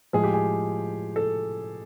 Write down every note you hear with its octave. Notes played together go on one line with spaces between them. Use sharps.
A2 F3 G#3 G#4
G4
G#4
A4